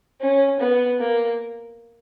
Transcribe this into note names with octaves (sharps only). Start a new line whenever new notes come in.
C#4
B3
A#3